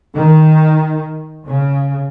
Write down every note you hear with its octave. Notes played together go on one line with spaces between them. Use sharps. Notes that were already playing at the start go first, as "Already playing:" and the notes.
D#3
C#3